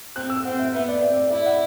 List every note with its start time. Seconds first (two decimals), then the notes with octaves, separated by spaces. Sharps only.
0.16 C4 F#6
0.30 E6
0.45 C4 F#5
0.59 E5
0.74 B3 E5
0.88 D5
1.02 C4 E5
1.16 D5
1.31 E4 D5
1.46 F#5